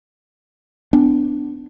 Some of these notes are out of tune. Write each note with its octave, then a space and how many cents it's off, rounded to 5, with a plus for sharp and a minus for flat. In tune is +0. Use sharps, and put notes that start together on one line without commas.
B3 +35 D4 +0